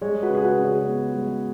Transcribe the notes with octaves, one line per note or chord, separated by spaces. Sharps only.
G#3 G#4 C#5
F#4 B4
C#3 G#4
F#4 B4
C#3
G#4 C#5
B3
G#3